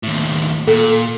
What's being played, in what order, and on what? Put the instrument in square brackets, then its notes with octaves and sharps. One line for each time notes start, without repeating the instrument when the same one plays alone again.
[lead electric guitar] D#2 A2
[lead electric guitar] A#2 [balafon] A4